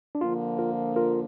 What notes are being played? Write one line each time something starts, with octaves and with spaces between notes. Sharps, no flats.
D4
D3 F3 A#3 F4
F4 A#4
F4 A#4